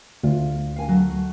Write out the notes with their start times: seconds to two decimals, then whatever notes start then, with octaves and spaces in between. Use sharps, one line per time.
0.24 D2 F4
0.76 F5 G#5
0.88 F#3 A3